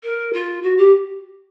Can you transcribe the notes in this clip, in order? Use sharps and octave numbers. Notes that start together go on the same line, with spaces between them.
A#4
F4
F#4
G4